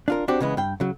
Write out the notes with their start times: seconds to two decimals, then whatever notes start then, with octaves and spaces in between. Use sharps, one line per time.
0.08 D4 F4 A#4
0.28 C4 D4 F#4 G4
0.40 C#3 E3 G#3 B3
0.57 G2 G5
0.80 C#3 F#3